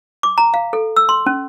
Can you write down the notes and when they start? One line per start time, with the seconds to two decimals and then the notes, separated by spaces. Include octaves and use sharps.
0.23 D6
0.38 A#5
0.54 F5
0.73 A4
0.96 E6
1.09 C6
1.26 C#4